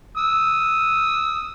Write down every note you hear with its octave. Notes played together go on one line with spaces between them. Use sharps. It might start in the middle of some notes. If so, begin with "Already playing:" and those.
D#6 E6